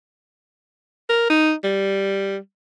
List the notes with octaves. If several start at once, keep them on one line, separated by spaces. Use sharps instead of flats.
A#4
D#4
G3